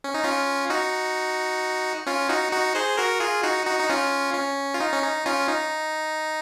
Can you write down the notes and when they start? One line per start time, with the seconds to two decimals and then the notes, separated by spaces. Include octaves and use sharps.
0.04 C#4
0.14 D#4
0.24 C#4 F4
0.70 D#4 F#4
2.07 C#4 F4
2.29 D#4 F#4
2.52 D#4 F#4
2.75 G#4 C5
2.97 F#4 A#4
3.20 F4 G#4
3.43 D#4 F#4
3.66 D#4 F#4
3.79 D#4
3.90 C#4 F4
4.34 C#4
4.74 F4
4.80 D#4
4.93 C#4
5.03 D#4
5.26 C#4 F4
5.48 D#4